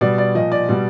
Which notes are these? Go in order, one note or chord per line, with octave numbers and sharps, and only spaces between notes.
B2 G3 D5
D5
A#2 F3 D#5
D5
B2 G3